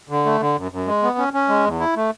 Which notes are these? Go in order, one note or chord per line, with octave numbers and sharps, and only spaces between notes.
D3
A3
D3
F#2
F#2
G#3
B3
C#4
C#4
G#3
E2
E4
A3